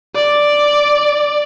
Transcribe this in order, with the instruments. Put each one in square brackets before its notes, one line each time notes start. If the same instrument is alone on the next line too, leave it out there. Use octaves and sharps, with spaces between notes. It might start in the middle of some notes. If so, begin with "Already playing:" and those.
[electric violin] D5